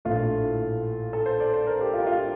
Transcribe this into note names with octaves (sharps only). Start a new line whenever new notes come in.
A#1 A2 A3 F4
A4
C5
D5
C5
A#4
G4
F4
F4